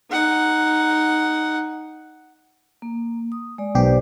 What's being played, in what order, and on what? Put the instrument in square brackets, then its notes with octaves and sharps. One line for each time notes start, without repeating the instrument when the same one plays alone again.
[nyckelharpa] D#4 F#5
[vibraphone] A#3
D#6
G#3 D5
[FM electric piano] B1 G4 [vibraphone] B4 C5 D5